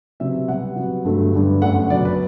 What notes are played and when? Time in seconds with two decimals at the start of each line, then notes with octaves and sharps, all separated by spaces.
0.20 C3 F#3 B3 E5
0.48 B2 G3 B3 F#5
0.76 C3 F#3 B3
1.05 G2 D3 F#3 A3
1.34 G2 D3 G3 B3
1.62 F#2 D3 A3 F#5
1.90 B2 F#3 B3 D5
2.05 B4